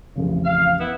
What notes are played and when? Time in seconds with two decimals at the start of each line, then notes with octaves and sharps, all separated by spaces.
0.16 A1 F2 C#3
0.45 F5
0.79 B3 E4